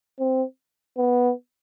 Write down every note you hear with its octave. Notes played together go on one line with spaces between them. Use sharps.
C4
B3